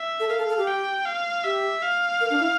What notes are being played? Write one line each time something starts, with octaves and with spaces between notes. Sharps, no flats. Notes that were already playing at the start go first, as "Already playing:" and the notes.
Already playing: E5
A4
A#4 F5
A4
A4
G4
G5
F5
G4 E5
F5
A#4
D4
E4